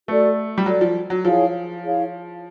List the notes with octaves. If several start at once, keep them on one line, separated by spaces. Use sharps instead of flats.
A3 F#4 A4 D5
G3
F#3 F#4 A4 D5
F3
F#3
F3 E4 G#4 C#5 F5
E4 G#4 C#5 F5